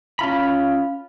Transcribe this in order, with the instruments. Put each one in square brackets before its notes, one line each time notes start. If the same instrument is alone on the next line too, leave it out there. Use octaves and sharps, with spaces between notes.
[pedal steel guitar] C#4 F4 B5